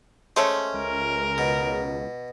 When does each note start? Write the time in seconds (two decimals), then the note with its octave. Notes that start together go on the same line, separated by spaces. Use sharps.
0.36 G#3 A3 C#4 C5
0.74 C#2 A#4
1.38 B2